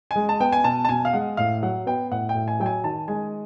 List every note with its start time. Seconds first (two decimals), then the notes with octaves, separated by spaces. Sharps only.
0.11 G#3 G#5
0.29 A5
0.40 B3 G5
0.52 G#5
0.64 B2 A5
0.85 A5
0.89 B2 G#5
1.05 F5
1.13 G#3 F#5
1.37 A2 F5
1.63 F#3 F#5
1.86 B3 G5
2.11 A2 F#5
2.29 G5
2.35 A2
2.48 G#5
2.60 F#3 G5
2.66 G#5
2.84 D#3 A5
3.08 G#3 G#5